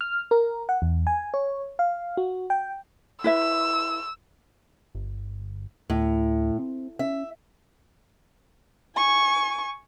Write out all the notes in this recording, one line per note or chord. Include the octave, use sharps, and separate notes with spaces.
F6
A#4
F#5
E2
G#5
C#5
F5
F#4
G5
E4 B4 E5 E6
G1
D2 A2
C4
C#4 E5
G#5 C#6